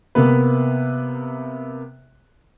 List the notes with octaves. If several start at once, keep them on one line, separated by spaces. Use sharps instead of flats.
C3 A#3 B3 B4